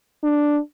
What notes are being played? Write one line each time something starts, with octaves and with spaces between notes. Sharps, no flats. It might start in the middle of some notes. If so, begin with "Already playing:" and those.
D4